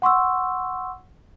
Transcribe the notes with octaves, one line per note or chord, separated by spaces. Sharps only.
F#5 C6 C#6 E6